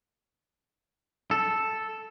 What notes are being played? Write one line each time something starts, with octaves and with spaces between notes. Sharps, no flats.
A4